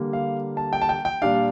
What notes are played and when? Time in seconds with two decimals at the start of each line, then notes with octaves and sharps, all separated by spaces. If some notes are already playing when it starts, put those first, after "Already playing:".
Already playing: D3 G3 A#3
0.13 F5
0.57 A5
0.73 G5
0.82 A5
0.89 G5
1.05 G5
1.22 A#2 G3 D4 F5